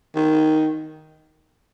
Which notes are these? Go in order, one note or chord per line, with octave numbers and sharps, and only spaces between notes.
D#3